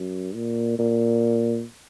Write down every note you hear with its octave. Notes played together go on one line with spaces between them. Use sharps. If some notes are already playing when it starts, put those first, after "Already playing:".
Already playing: F#2
A#2
A#2